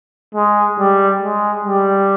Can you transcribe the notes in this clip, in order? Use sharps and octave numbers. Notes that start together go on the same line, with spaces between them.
G#3
G3
G#3
G3